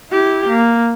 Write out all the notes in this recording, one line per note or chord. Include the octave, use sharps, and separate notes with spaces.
E4 G4
A#3